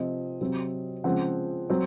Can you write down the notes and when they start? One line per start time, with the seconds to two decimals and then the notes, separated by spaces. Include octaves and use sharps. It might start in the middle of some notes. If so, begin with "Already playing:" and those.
Already playing: C3 F3 C4 D#5
0.41 C3 F#3 C4
1.04 C#3 F3 G#3 C4 F#5
1.70 F#3 C4